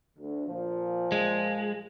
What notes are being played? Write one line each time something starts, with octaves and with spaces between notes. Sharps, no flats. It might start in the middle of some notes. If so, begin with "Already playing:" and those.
D2
A#2 F3
G#3